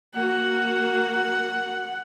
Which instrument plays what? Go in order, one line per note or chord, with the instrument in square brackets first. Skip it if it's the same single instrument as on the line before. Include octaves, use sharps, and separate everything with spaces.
[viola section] A#3 F#4 [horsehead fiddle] F#5